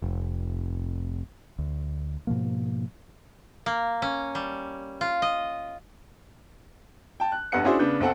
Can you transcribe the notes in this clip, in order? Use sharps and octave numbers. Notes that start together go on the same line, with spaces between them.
F1
D2
G#2 B2 F3 A#3
A#3
C#4
G3
F4
D#5
G5 A5
F#6
F1 G2 B3 F#5 F#6 C#7
C#4 D4 E4 F#4 G#4 C5
C#3 B3 D4 G6
B1 C4 A4 F#5